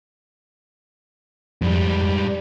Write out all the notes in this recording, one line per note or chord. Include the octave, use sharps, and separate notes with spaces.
F2 G#2 G3